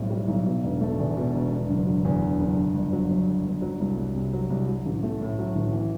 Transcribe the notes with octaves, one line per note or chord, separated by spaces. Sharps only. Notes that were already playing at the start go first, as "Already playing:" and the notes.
Already playing: B1 A2 G3 C4
G3
B1
B2
E1
A3
E2
B2
E1
D3
F#1
F#3
E2
D3
F#1
D3
G1
F#3
F#2
D3
G1
F#3
C2
C2
C3
F#3
C2
F#3
A1
A3
A2
F#3
A1
E3